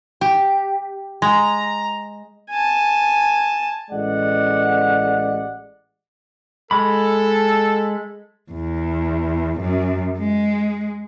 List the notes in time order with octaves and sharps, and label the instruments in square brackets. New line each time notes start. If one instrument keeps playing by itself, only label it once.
[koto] G4
[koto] G#3 [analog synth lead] A#5
[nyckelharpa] G#5 A5
[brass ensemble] A1 G#3 D5 F#5
[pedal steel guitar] G#3 B5 [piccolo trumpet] A4
[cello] E2
F#2
G#3